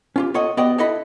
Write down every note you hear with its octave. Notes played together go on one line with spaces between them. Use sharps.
C#4 F4 G4
F4 A4 C#5 D#5 F#5
B3 F#4 G4 D5 D#5 G5
D4 E4 A4 D#5 B5